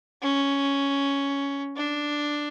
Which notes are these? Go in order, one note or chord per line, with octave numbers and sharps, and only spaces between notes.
C#4
D4